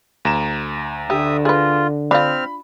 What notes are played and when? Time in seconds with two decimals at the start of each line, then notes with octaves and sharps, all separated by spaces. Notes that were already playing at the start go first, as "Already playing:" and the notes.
0.25 D2 A#5 E7
1.10 D3 G4 E5 D#6
1.45 F4 G#4 B4
2.11 C4 D4 F4 B5 F6